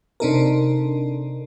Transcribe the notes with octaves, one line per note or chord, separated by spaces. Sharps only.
C3 C4 D4 D#4 A4 A#4